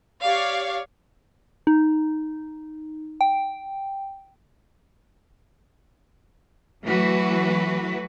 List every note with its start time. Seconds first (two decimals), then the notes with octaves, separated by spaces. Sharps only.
0.22 G4 C#5 D5 F5
1.67 D#4
3.21 G5
6.84 E3 F#3 A3 F#4 B4